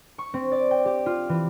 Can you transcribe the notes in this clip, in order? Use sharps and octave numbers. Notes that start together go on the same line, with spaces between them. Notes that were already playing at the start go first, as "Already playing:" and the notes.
C#6
C4
D5
G5
G4
F4
E3